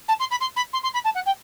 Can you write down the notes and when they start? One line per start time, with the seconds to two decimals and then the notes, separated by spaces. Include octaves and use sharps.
0.08 A5
0.19 C6
0.31 B5
0.40 C6
0.56 B5
0.73 C6
0.83 C6
0.94 B5
1.04 A5
1.15 F#5
1.26 G5